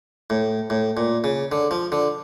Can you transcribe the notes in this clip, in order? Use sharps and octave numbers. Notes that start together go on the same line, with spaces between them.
A2
A2
A#2
C#3
D3
F3
D3